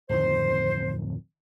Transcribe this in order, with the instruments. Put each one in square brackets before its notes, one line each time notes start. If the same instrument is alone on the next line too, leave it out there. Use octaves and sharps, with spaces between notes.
[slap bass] D1 F2 D#3 [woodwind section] C5